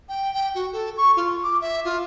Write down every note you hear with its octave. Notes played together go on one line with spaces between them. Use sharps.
G5
G5
F#4
A4
C#6
F4
D6
E5
F4